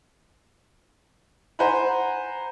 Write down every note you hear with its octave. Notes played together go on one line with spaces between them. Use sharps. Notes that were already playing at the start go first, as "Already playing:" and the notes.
C5 F#5 G#5 A#5 B5